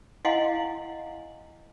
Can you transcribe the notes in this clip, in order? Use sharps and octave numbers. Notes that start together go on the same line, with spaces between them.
E4 D#5 F5 F#5 G#5 C6